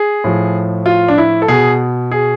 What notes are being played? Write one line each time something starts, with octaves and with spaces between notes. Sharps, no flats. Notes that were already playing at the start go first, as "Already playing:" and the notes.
Already playing: G#4
A2 F3
F4
D4
E4
A4
B2 G#4
G#4